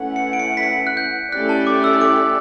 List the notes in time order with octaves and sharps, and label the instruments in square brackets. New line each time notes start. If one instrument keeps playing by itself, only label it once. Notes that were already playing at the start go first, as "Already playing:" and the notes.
Already playing: [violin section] A3 C#4 E4 B4 F#5
[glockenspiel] C#7
D7
C#7
B6
C#7
F#6
G6
[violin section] A3 C#4 E4 G4 D5 [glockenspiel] F#6
[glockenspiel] A5
D6
E6
D6